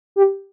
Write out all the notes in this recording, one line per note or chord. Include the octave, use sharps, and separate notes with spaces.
G4